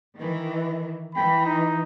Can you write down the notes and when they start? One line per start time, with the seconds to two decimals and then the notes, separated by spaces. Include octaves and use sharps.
0.16 D#3 E3
1.15 E3 G5 B5
1.45 D#4